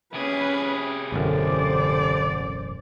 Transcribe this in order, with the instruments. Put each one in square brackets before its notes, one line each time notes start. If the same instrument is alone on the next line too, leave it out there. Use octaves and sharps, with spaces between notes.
[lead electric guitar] C3 G#4 [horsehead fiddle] C#4 B4
[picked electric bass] E1 A1 F#2 [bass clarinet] D3 [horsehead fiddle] C5 D5